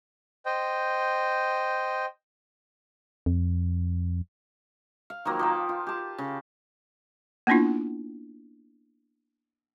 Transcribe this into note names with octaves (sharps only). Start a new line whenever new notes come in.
C5 D#5 G5
F2
F5
D#3 F3 F#3 A#3
F3 G5 A5
F4
G4 A5
C#3
A#3 B3 C#4 D4 E4 F4